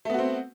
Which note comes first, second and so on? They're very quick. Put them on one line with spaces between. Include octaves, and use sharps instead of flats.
A3 B3 F#4 C4